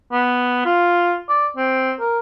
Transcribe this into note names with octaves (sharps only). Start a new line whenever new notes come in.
B3
F4
D5
C4
A#4